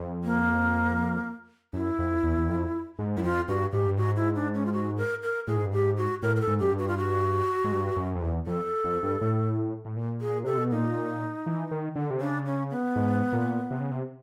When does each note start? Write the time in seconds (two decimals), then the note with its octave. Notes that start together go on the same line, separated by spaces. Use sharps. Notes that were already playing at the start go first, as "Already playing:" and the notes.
Already playing: F2
0.24 A#3
1.73 F#2 E4
1.99 F2
2.23 E2
2.38 E2
2.48 F2
2.99 G#2
3.17 F#2 E4
3.23 F2 F4
3.48 G2 F#4
3.72 G#2 G4
3.86 G2
3.97 G#2 F#4
4.16 E4
4.35 D4
4.54 C#4
4.66 F4
4.73 F#4
4.97 A#4
5.23 A#4
5.47 A2 G#4
5.56 G#2
5.65 G2
5.73 G#2 G4
5.98 F#4
6.23 A2 A#4
6.36 A#4
6.41 A4
6.47 G#2
6.60 F#2 G4
6.72 G2
6.79 F#4
6.88 F4
6.98 F#4
7.64 G#2
7.72 G2
7.97 F#2
8.15 F2
8.22 E2
8.47 F2 A4
8.84 F2
9.03 G2
9.21 A2
9.85 A2
9.96 A#2
10.21 G#4
10.44 C3 A4
10.57 B2
10.71 A#2 D#4
11.46 E3
11.71 D#3
11.96 D3
12.10 C3
12.21 C#3 D4
12.46 C#4
12.71 B3
12.96 G#2
13.33 A#2
13.71 C3
13.80 C#3
13.91 C3